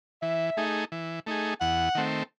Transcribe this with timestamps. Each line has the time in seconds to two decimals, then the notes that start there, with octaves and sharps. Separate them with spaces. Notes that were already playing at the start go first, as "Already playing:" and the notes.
0.22 E3 E5
0.57 A3 D#4 G#4
0.92 E3
1.26 A3 D#4 G#4
1.60 E2 F#5
1.95 D#3 A3 C4